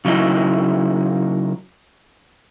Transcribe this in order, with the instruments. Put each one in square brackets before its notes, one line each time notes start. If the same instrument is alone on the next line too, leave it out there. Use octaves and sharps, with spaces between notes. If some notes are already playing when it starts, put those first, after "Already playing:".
[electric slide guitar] C#3 F#3 D#4 E4